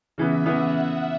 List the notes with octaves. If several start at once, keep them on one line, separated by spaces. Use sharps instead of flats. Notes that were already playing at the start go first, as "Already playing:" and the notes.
C#3 E3 B3 E5
C#3 E3 B3 F#5